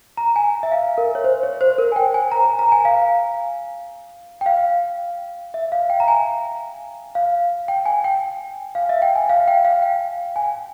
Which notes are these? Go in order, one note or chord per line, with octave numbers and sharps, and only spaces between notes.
A#5
G#5
E5
F5
A#4
C#5
C5
C#5
C5
A#4
G#5
G5
G#5
A#5
G#5
A#5
G#5
F5
G5
F5
E5
F5
G5
A#5
G#5
F5
G5
G#5
G5
F5
E5
G5
G#5
F5
G5
F5
G5
G#5